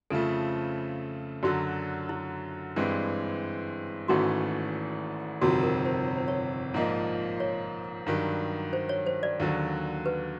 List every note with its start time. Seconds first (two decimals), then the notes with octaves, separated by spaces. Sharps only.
0.10 F2 C#3 F3 A3 A4
1.43 F#2 D3 F#3 F#4
2.09 E4
2.76 G2 E3 G#3 C4
4.08 G#1 G#2 E3 A3 C#4 F#4
5.41 G1 F2 C3 D#3 F#4
5.63 A#4
5.86 C5
6.07 C#5
6.18 C5
6.28 C#5
6.74 A#1 G#2 F3 A#3 D#4
7.40 C#5
8.07 G2 D#3 F#3
8.73 C5
8.89 C#5
9.07 C5
9.23 D5
9.40 D#2 D3 F#3
10.06 B4